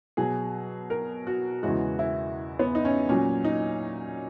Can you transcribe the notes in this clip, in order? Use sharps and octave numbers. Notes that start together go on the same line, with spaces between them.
B2 F#3 G#4
A#4
F#4
E2 C#3 E3 G#3 F#4
E4
B3
D#4
C#4
A#2 F#3 C#4
D#4